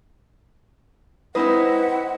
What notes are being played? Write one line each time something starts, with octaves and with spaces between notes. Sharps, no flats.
G#3 C4 D#4 E4 B4 C5 F#5 B5